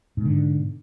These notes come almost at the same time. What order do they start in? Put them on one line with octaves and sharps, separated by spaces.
G#2 B2 D3